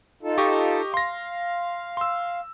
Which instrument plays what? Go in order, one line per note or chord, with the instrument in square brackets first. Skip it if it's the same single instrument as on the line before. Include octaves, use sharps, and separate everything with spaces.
[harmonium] D#4 F4 A4
[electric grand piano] G4 D#5 C#6
[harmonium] F5 [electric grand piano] C6 A#6
[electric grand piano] C6 E6